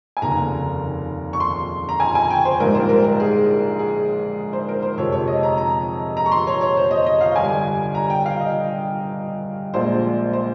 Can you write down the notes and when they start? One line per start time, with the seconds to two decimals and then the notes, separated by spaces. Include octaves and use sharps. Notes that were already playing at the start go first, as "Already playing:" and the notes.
0.17 G#5
0.22 F1 D#2 C#3 A#5
1.33 C#6
1.40 C6
1.89 A#5
2.00 G#5
2.15 G#5
2.30 G5
2.45 C5
2.60 A#1 G#2 G3 A#4
2.75 C5
2.89 A#4
3.04 A#4
3.20 G#4
3.79 G#4
4.53 C5
4.69 A#4
4.83 C5
4.97 F2 C3 F3 G#3 C#5
5.12 C#5
5.28 D#5
5.43 A#5
5.58 A#5
6.17 A#5
6.26 C#6
6.32 C6
6.47 C#5
6.61 C#5
6.77 C5
6.91 D#5
7.06 D#5
7.21 F5
7.36 G1 G2 G3 G#5
7.95 A#5
8.10 G5
8.26 F5
8.40 D#5
9.74 A#1 A#2 G#3 C5
10.33 C5